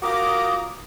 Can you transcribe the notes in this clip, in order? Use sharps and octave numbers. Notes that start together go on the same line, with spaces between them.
F4 F#4 A#4 A#5 D6 D#6